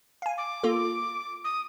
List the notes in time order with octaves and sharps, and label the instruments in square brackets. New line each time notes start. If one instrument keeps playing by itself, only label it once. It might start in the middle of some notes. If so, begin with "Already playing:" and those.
[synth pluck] F5 G#5
[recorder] D6
[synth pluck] A#3 F4 A4
[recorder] D#6